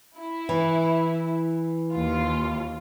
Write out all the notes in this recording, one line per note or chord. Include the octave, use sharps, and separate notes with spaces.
E4
E3
D#2 F4